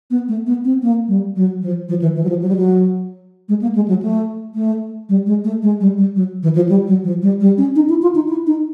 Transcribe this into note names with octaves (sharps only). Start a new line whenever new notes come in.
B3
A3
B3
C4
A#3
G3
F#3
F3
F3
E3
E3
F#3
F3
F#3
G3
F#3
G#3
A#3
G#3
F#3
A3
A3
G3
G#3
A3
G#3
G3
G3
F#3
E3
F3
G3
F#3
F3
G3
G3
C#4
D#4
E4
F4
D#4
E4
D#4